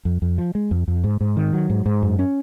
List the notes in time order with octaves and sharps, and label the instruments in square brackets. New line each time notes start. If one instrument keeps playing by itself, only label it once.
[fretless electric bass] F2
F2
F3
G#3
F2
F2
G#2
G#2
D#3
F#3
G#2
G#2
F#2
C#4